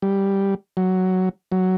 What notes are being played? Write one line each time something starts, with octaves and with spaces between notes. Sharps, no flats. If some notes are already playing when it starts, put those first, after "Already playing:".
G3
F#3
F#3